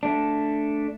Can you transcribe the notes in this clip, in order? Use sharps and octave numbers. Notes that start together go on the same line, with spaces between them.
A3 D4